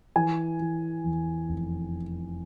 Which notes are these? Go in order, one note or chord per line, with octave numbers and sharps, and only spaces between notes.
E3 G#5
E3
E2
F1